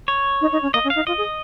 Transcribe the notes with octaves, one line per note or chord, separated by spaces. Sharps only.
C#5
D#4
D#4
C#4
A#3 D#5
C#4
F5
D#4
F4 D#5
G#4